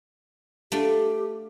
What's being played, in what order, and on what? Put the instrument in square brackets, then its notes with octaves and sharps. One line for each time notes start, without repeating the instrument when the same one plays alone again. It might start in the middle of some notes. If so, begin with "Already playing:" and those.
[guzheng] A3 D4 F4 [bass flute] G4